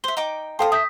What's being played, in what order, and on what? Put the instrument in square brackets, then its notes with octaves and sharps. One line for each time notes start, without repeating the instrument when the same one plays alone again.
[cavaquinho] C5 E5 [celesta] G7
[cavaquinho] D#4 G5 D6
[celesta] A4 G5 A5 [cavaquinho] C5 F5 D#6
[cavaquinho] E5 [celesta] D#6 G6 B6